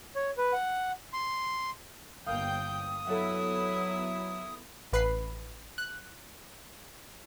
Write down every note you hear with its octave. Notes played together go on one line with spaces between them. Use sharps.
C#5
B4
F#5
C6
G1 A#3 F5 G5 D#6 G6
F#3 B3 E4 A4 E5 F#5
A1 B4 B5 C7
F#6